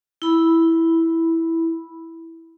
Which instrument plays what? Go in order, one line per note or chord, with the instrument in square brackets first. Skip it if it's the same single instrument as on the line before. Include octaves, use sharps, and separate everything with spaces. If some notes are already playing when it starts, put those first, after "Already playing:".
[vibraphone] E4 B5